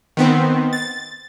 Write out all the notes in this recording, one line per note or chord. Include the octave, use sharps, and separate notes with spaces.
D#3 B3 C4
A6